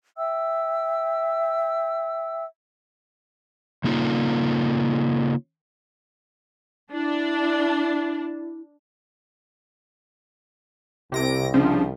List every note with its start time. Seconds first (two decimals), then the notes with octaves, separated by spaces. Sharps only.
0.16 E5 G5 E6
3.84 C#3 A#3 D#4 F4
6.92 D4 E4
11.12 C2 C3 A#6 D7
11.54 C#3 F3 D4